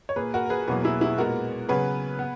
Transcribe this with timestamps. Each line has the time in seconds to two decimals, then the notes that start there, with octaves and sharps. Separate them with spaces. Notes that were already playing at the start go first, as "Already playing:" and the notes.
0.09 C#5
0.16 A#2 A#3 G#4 B4
0.34 F#4 A#4
0.45 A#4
0.50 G#4 B4
0.67 E2 B2 F#3 A#3 G#4 B4
0.84 E4 G#4
1.01 E4 G#4
1.18 A#2 G#3 B3 F#4 A#4
1.69 C#3 F#3 B3 G#4 B4
2.19 B3